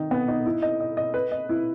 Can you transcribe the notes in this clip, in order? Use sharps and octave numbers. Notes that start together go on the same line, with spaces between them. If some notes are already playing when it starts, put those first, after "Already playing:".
Already playing: D#3 D#4
B3
D#4
E4
D#5
D#5
D#5
B4
D#5
E4